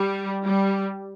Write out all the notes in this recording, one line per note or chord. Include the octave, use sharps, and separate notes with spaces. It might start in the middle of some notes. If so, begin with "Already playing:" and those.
Already playing: G3
G3